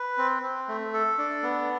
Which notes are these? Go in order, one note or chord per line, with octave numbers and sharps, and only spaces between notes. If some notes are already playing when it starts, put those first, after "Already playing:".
Already playing: B4
C4
C4
A3
A4
D4
B3